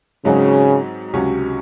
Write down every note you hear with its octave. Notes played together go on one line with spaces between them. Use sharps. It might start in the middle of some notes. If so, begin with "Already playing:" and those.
G#2 C#3 F#3 C4 D#4 F#4
C#2 C3 F#3 C#4 F#4